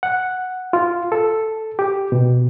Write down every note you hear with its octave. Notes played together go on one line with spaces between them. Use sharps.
F#5
F4
A4
G4
B2